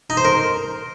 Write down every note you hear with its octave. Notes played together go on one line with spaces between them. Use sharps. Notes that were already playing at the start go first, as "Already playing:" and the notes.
D#4
C5
A#4